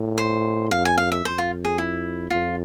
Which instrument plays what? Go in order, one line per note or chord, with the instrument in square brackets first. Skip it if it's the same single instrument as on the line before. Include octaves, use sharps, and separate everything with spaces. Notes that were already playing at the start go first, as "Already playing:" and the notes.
Already playing: [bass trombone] A2
[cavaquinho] C5
[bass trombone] F2 [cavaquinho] F5
[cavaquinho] G#5
F5
E5
[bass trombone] F2 [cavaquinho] C5
[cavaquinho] F4
G#4
E4
[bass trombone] F2 [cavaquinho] F4